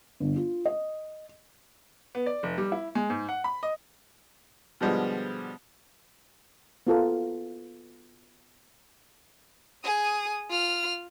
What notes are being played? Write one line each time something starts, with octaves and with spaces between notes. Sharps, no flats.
G1
F4
D#5
B3
D5
F1
G3
E4
G#3
G#2
F#5
B5
D#5
B2 D3 F3 G3 G#3 B3
B3 F4 A4 A#4
G#4 D#6
F4 F6